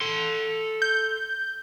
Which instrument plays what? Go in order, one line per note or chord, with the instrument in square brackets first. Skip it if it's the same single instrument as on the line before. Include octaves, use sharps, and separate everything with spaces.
[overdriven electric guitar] A4 C6
[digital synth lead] G6